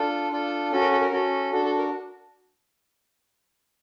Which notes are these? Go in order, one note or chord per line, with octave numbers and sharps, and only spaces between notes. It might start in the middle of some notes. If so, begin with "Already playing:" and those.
Already playing: D4 F4 A4
D4 F4 A4
C#4 F#4 A4
A#4
A4
A#4
C#4 F#4 A4
D4 F#4 A4
A4
A#4